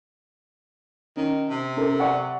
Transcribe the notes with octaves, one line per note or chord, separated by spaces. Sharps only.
D#3 C#4
C3
C#4 A4 A#4
D5 F#5 C#6